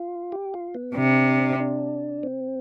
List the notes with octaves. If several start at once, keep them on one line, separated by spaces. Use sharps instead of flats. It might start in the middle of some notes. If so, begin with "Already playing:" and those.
Already playing: F4
G4
F4
B3
C3 D4
D4
C4